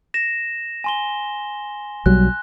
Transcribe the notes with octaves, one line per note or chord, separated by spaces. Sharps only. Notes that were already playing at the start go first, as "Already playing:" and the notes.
A#6 E7
G#5 C6 G7
B1 F#3 G3 F#6